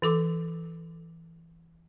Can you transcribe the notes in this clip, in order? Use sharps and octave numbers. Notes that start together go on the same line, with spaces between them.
E3 A4 D6